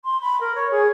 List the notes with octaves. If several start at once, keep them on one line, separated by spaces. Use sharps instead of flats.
C6
B5
A#4
C#5
G#4